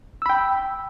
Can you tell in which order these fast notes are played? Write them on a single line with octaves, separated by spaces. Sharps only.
E6 B5 G5